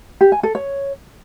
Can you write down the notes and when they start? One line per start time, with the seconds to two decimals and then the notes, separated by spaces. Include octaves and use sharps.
0.21 G4
0.32 G#5
0.43 A4
0.55 C#5